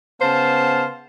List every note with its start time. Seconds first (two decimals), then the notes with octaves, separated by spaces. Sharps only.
0.21 C#3 B3 C5 F5 A5